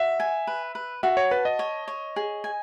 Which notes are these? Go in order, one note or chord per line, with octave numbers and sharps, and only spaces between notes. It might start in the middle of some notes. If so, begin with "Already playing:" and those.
Already playing: F#4 E5
G#5
B4
B4
F#4 E5
C#5
B4 A5
D#5
C#5
C#5
G#4
G#5